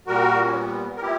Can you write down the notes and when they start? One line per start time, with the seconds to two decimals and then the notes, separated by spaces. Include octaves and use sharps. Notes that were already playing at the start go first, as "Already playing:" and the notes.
0.07 A#2 G3 F#4 A#4
0.44 C#4
0.54 B3
0.96 A#4
1.02 A#2 E4 G4